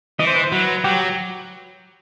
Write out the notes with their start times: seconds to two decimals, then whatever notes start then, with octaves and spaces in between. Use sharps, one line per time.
0.19 E3 D#5
0.27 C5
0.36 B4
0.43 C5
0.52 F#3 B4
0.84 F#3 G4